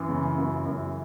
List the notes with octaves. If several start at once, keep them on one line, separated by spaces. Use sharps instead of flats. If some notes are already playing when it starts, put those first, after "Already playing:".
Already playing: F#2 E3
C#3
F#2
F#2